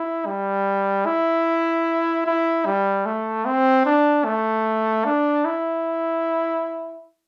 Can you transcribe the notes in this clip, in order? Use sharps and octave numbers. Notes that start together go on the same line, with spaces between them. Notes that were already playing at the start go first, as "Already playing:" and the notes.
Already playing: E4
G3
E4
E4
G3
A3
C4
D4
A3
D4
E4